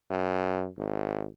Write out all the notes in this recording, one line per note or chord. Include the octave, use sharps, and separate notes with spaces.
F#2
G#1